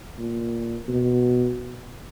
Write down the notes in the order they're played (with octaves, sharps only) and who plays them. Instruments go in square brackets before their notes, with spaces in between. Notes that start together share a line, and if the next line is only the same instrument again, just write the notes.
[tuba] A#2
B2